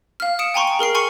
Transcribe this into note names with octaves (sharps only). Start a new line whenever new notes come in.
F5 F6
D#6 C#7 D7 E7
G5 G#5 A#5 C6 C#6
D7
G#4 A#4 F6 C7
G#5 C6 C#6 F6 C#7